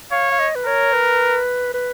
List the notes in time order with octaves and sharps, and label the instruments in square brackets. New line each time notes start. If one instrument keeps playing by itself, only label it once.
[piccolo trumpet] C#5 [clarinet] F5
[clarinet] F5
D#5
B4
[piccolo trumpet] A#4 [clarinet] C#5
[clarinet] B4
B4